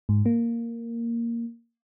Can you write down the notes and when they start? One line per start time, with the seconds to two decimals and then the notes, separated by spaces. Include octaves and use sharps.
0.09 G#2
0.26 A#3